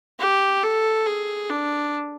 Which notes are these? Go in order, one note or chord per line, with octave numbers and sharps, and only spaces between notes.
G4
A4
G#4
D4